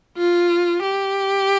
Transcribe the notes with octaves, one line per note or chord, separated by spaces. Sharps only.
F4
G4